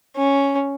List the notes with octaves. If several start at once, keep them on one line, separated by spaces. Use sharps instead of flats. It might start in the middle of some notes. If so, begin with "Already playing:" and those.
C#4